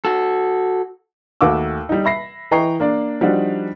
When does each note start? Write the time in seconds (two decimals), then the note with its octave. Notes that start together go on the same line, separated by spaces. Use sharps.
0.05 F#4 A4
1.41 D#2 A3 F#4 D6 E6
1.89 G3 D#4
2.05 E5 B5 A#6 C7
2.51 E3 D#5 G5 A#5 C#6 C7
2.80 A#3 D4 D5
3.21 F3 G3 D4 D#4 F#4